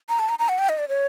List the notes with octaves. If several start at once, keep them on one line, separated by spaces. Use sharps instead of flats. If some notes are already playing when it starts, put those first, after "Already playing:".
A#5
A5
A#5
A#5
F#5
G5
D#5
D5
C#5